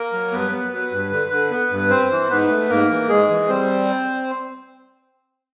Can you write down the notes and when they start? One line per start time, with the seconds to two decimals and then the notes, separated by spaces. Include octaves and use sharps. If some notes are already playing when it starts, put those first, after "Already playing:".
Already playing: A#3 A#4
0.13 F#3
0.32 G2 B3 B4
0.52 B3
0.73 F#3
0.91 G2
1.12 D3
1.31 D3
1.51 B3
1.71 G2
1.90 C4 C5
2.10 E3
2.30 G#2 B3 B4
2.49 A3
2.69 G#2 A#3 A#4
2.89 E3
3.09 G#2 G#3 G#4
3.29 E3
3.48 G3 C4 C5